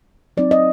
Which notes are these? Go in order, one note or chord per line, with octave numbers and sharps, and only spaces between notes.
F#3 C4 D#4 D5
D#5